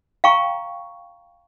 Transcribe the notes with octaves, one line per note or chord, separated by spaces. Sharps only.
F5 G5 A#5 C#6